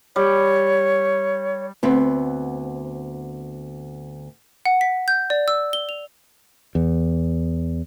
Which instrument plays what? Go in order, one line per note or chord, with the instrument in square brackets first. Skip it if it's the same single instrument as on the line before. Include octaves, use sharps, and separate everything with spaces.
[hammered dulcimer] G3 [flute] C#5
[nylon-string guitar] D2 B3 C4
[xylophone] F#5
B6
G6
D5
E6
G7
F7
[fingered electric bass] E2